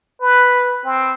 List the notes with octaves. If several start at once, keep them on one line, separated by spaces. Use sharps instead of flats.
B4
C4